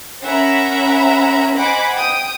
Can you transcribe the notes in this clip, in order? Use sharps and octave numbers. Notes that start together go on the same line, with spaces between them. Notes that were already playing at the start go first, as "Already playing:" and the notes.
C#4 A#4 E5 F#5 A#5 B5
C5 D#5 F#5 G#5 B5 D6
G5 D#6